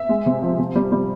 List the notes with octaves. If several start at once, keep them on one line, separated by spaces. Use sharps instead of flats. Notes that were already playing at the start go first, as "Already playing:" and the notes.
Already playing: E5
G#3
C3
F3
C3
G3
G3